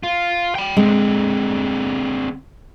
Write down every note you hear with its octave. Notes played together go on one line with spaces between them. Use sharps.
F4
G5 B5
D3 G#3 C4